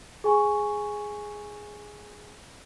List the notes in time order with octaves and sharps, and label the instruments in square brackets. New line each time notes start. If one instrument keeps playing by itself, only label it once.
[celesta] G#4 G#5 C#6